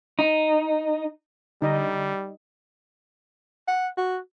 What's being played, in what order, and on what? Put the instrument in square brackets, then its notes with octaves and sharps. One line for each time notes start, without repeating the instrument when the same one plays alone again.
[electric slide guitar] D#4
[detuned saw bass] D3 [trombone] G3 [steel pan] D#4 D#5
[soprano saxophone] F#5
F#4